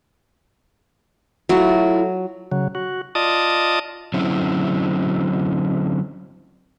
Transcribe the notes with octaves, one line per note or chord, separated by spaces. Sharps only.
F#3 A3 E4 F4
C#3 F#3
F#4
F4 D5 D#5 A5 D#6
D3 F#3 C4 C#4 E4